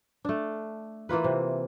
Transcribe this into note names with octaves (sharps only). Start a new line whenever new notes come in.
A3 D4
E3 A#3 F4 B4
C3